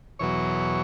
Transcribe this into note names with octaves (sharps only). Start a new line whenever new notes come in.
E2 B2 F#3 C#5